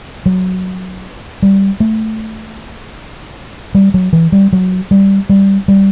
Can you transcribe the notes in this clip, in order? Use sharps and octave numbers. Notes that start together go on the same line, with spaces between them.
F#3
G3
A3
G3
F#3
E3
G3
F#3
G3
G3
G3